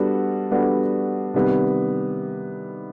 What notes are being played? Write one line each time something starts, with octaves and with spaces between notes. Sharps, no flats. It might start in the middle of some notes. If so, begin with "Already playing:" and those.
Already playing: G3 B3 D4 F#4 A4
G3 B3 D4 F#4 A4
C3 D#3 G3 B3